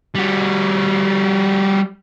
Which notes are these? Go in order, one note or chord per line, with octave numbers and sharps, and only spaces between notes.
G3 F#4